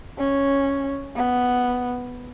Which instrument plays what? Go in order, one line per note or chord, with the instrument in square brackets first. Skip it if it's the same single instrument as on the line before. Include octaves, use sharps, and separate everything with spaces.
[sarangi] C#4
B3